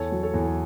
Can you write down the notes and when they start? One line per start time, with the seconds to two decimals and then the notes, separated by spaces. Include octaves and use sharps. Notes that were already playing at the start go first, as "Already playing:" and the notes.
Already playing: E2 A4 C#5
0.12 F#3
0.23 A4 C#5
0.34 E2